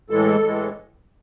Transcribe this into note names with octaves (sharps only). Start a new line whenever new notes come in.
A2 E3 G#3 A4
A2 E3 G#3